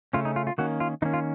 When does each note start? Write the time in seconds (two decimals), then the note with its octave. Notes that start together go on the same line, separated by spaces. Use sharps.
0.13 C#3 A3 C#4 F4
0.25 D#4
0.36 F4
0.47 F4
0.58 D#3 A#3 C#4 F#4
0.80 F4
1.02 D#3 A#3 C#4 D#4
1.14 F4